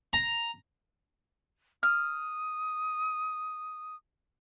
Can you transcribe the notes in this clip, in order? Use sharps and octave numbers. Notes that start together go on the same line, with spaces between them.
A#5
D#6 F6